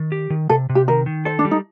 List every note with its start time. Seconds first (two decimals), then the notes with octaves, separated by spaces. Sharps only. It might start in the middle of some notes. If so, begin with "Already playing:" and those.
Already playing: D#3
0.12 G4
0.30 D#3
0.49 C3 A4
0.69 C3
0.75 G4
0.88 D#3 A#4
1.06 D#3
1.25 A4 C5
1.39 D4
1.45 G3
1.51 D#4